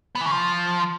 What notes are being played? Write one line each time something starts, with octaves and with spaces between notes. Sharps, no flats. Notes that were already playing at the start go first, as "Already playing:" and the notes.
B3
E3
C#3
F3